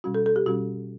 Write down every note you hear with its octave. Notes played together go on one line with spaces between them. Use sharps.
B2 G3 C#4 F#4
A4
A4
G4
B2 G3 C#4 F#4